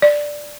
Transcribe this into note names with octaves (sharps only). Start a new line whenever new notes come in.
D5